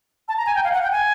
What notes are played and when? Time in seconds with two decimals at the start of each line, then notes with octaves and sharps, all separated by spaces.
0.28 A5
0.38 A#5
0.46 G#5
0.55 G5
0.64 F5
0.73 F#5
0.83 G5
0.92 G#5